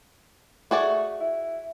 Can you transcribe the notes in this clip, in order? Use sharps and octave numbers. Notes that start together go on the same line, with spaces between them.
A3 F#4 G#4 D5
E4